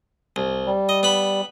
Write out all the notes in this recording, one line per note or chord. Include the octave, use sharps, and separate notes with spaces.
C2
G3
D#5
B3 B5